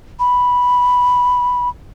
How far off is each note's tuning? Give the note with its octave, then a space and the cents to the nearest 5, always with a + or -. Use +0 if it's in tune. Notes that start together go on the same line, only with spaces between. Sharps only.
B5 -5